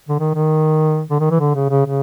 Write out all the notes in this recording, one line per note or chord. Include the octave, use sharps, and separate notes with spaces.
D3
D#3
D#3
D3
D#3
E3
D3
C#3
C#3
C#3